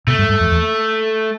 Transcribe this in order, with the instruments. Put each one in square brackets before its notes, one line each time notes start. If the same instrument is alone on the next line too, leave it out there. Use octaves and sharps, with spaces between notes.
[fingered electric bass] B2 [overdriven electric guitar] A3
[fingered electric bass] G2
G2
F2
E2